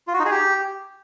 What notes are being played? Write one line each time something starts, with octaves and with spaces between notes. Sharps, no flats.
F4
F#4
D#4
G#4
G4